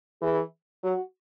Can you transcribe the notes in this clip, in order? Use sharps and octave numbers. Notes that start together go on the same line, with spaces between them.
E3 G#4
F#3 F#4